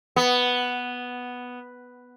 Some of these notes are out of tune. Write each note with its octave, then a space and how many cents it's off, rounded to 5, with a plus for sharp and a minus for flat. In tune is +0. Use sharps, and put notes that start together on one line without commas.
B3 +0